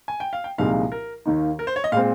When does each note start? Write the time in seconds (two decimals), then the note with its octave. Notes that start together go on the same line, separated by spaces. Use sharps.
0.08 G#5
0.20 G5
0.33 F5
0.44 G5
0.58 C2 A#2 F3 G#3 D#4 F5
0.92 A#4
1.26 D#2 D#3 A#3 D#4
1.59 A#4
1.67 C5
1.76 C#5
1.84 D#5
1.92 A#2 G#3 C4 F5